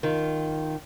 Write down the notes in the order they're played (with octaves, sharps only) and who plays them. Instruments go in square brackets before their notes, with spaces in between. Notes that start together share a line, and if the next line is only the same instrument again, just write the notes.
[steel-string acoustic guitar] D#3 F4